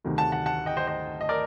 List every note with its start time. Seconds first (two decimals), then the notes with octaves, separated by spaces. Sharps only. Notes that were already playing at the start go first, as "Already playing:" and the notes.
0.04 D2 C3 D#3 A3
0.18 F#5 A5
0.32 F#5 A5
0.46 F#5 A5
0.66 D#5 G5
0.77 C5 D#5
0.87 C5 D#5
1.21 D#5
1.29 A#4 D5